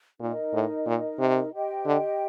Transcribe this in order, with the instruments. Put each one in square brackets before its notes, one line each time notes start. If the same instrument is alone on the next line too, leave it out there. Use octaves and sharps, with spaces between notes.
[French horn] A#2 [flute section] D#4 A#4 D#5
[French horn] A2
A#2
C3
[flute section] G4 C5 D#5 G5
[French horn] D3